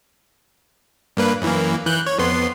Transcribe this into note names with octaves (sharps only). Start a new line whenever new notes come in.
G2 A#3 B4
F#2 E3 A#3
E3 F#6 G6
C#5
F2 B3 C6